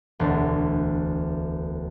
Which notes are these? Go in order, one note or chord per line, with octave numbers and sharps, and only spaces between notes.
E1 D2